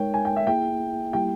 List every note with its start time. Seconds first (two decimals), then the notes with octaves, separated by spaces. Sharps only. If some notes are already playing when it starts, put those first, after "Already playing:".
Already playing: G#3 D#4 A#4 C#5 G5
0.14 G#5
0.25 G5
0.36 E5
0.47 A#3 E4 G#4 G5
1.13 G3 A#3 E4 G4 G5